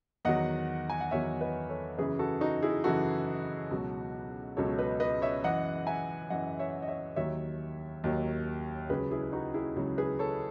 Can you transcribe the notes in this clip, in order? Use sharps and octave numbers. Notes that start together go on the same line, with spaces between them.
E2 D#3 F#3 D#5 F#5
G#5
F#5
E2 D#3 F#3 C#5 E5
B4 D#5
A4 C#5
F#2 C#3 E3 G#4 B4
F#4 A4
D#4 F#4
E4 G#4
F#2 C#3 E3 F#4 A4
C#2 B2 F#3
C#2 B2 F#3 A4 C#5
B4 D#5
B4 D#5
C#5 E5
F#2 E3 D#5 F#5
E5 G#5
F#2 E3 D#5 F#5
C#5 E5
D#5
C#5 E5
D#2 D#3 F#3 C#5 E5
D#2 D#3 F#3
C#2 C#3 F#3 G#4 B4
E4 G#4
D#4 F#4
E4 G#4
C#2 C#3 F#3
G#4 B4
A4 C#5